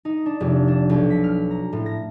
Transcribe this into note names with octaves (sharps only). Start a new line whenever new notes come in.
D#4
D4
F1
D4
B1
B6
F6
A#5
A2
A#6